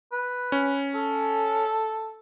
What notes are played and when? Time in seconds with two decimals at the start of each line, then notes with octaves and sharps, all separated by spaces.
0.12 B4
0.52 C#4
0.94 A4